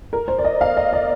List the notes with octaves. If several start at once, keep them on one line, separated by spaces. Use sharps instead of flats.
A#4
C5
D5
D#5
F5
D#5
D5